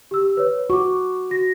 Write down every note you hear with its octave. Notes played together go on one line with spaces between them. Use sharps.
G4 E6
B4 C#5
F#4 C#6 D6
F#4 A#6